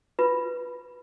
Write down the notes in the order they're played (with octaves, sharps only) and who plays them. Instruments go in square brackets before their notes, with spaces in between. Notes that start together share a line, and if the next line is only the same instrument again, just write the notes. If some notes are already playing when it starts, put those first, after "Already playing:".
[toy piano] F4 B4